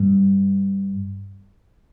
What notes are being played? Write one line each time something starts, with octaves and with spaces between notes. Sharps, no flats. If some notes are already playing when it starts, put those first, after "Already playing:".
Already playing: G2